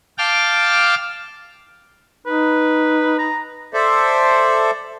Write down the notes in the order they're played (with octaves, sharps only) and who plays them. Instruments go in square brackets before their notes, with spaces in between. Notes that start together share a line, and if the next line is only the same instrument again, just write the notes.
[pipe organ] F5 G5 A5 D6 F6
[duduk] D#4 [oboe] B4
[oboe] A#5
[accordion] A4 C5 D5 E5